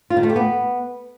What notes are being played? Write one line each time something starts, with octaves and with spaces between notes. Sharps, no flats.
F4
D#3
A3
G4
B3